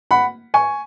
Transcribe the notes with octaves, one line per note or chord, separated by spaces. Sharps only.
F#5 B5
G#5 C#6